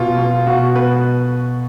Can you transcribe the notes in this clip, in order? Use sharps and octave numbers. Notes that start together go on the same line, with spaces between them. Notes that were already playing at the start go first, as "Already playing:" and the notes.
Already playing: B2 F4
B2
B2 F#4
B2 B4